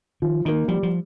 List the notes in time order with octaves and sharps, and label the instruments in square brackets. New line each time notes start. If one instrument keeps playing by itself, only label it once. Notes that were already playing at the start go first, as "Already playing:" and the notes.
[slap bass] D#3 [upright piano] F3
[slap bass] D#3 [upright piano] A#3 D#4
[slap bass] F3 [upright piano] G3
[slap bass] F3